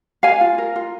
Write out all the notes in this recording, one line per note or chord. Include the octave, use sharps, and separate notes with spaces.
A#4 F5 G#5
F4
A#4
F4